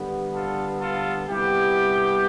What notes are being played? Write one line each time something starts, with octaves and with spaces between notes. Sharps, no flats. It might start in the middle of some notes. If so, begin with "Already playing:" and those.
Already playing: G2 D3 G3 B3
F4 A4
F4 A4
C3 G3 B3 E4 G4